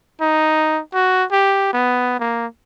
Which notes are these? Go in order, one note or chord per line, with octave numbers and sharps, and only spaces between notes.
D#4
F#4
G4
B3
A#3